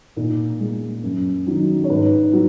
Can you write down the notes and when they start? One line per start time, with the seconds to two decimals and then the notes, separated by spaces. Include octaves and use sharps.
0.17 A#2 D#4
0.60 G#3
1.04 F#2
1.46 D#3 F#3 D#4
1.84 C#5
1.90 G#2 B4
2.33 F#3